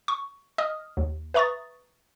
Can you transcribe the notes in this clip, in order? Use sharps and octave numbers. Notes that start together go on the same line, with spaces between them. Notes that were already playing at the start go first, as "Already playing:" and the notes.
C#6
D#5 D#6 F6
D#2
B4 E5 A#5 C#6 D#6 A6